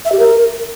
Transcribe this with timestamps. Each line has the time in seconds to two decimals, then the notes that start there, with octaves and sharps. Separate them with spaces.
0.05 E5
0.12 G4
0.19 A#4